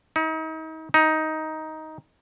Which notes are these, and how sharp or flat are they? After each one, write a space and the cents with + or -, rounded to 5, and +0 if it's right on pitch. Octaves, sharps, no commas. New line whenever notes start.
D#4 +35
D#4 +10